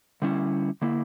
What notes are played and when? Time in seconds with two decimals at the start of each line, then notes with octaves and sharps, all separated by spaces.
0.22 D3 G3 C#4 E4
0.82 D3 A#3 E4